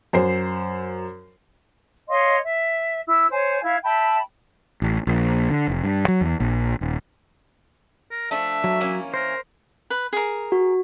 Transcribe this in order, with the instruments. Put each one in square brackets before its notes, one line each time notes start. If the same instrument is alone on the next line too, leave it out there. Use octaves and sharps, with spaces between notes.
[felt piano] F#2 C5 C7
[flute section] C#5 D#5 F5 C6
E5
E4 E6
C5 C#5 G#5
E4 E5 F5 G#6
E5 G5 A5 B5
[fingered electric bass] A1
A#1
D3
F1
G2
F#3
E2
A#1
D#1
[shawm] A#4
[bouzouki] F3 A3 D4 [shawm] E5
[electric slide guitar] F#3
[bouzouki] E3 A#3 C#4
[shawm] A#4 [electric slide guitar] C5
[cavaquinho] B4
G#4 A#4
[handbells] F#4